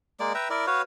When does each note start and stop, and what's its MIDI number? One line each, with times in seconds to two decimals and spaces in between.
0.20 0.33 56
0.20 0.33 58
0.20 0.33 74
0.35 0.48 71
0.35 0.48 76
0.35 0.48 79
0.35 0.48 82
0.50 0.66 64
0.50 0.66 70
0.50 0.66 74
0.67 0.82 66
0.67 0.82 71
0.67 0.82 73
0.67 0.82 77